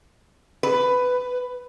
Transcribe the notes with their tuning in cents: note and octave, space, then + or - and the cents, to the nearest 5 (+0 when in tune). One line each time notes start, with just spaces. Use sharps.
B4 +15